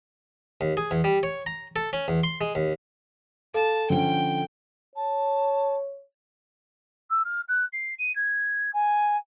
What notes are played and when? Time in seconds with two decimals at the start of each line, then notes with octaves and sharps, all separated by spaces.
0.61 D#2
0.77 G#4
0.91 E2
1.04 G3
1.23 C#5
1.46 A#5
1.76 A4
1.93 C#4
2.08 E2
2.23 C6
2.41 G#3
2.55 D#2
3.54 A4 F5 A5
3.90 D3 F3 C#4 G5
4.96 C#5 A5
7.10 E6
7.24 F6
7.48 F#6
7.72 C7
7.98 D#7
8.15 G#6
8.73 G#5